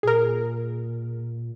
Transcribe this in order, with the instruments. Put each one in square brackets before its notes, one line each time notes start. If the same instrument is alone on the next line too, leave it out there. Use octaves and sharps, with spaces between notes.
[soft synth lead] A#2 [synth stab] G#4 A#4